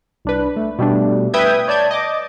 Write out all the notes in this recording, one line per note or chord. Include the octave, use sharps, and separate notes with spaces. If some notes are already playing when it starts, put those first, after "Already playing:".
C2 D4 B4
A3
B2 G3 A3 D4
B4 E5 G5 D#6 G6 G#6
C#5 D5 A5 G6 G#6
D#5 D6